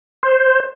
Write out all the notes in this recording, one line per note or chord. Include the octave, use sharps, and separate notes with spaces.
C5